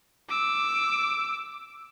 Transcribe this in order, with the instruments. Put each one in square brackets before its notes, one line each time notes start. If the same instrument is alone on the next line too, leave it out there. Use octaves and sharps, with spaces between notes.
[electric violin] D6 E6